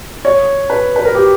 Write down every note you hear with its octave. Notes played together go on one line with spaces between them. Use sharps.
C#5
B4
B4
A#4
G4